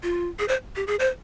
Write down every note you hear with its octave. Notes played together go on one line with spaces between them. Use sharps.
F4
G#4
C5
G4
G#4
C5